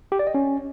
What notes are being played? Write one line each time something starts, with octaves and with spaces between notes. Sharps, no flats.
G4
D5
D#5
C#4